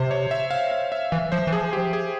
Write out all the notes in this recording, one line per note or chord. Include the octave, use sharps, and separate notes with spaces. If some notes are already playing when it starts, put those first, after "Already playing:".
Already playing: C3 C5
C#5
E5
F5
F5
E5
E3 E5
F3 C5
E3
F3 G#4
G4
G#4